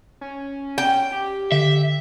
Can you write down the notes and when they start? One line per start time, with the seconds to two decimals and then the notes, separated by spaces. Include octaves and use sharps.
0.21 C#4
0.78 G5
1.12 G4
1.52 D3 E5